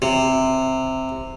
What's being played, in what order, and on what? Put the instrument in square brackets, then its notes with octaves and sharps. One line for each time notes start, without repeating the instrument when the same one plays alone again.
[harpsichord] C3